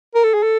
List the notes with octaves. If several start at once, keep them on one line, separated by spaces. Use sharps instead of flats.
A#4
A4
G#4
A4